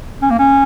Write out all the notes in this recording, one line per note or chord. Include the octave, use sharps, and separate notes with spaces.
C#4
A#3
C#4